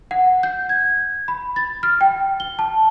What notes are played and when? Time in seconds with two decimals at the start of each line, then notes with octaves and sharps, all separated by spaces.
0.11 F#5
0.43 G6
0.69 G#6
1.28 B5
1.56 A6
1.83 F6
2.01 G5
2.40 G7
2.59 A5